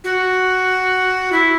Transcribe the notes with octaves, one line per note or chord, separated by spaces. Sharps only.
F#4
E4